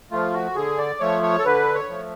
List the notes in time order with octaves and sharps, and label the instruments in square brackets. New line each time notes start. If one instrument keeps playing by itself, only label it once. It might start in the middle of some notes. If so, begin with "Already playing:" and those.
[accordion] F3 A3 F4
F#4
D3 G#4
D5
F3 A3 C#5
C#5
A4
D3 B4
C#5
F3 A3